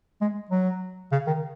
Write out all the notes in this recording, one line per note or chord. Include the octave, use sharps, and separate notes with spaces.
G#3
F#3
C#3
D#3